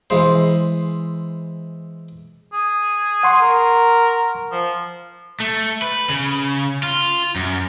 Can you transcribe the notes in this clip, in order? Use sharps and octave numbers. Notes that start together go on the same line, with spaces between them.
E3 G#3 C5
G#4
F#5 C6 C#6
A#4
F3
A3
B4
C#3
F4
F#2